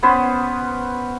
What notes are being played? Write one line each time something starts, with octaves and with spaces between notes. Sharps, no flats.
B3 C#4 B4 C5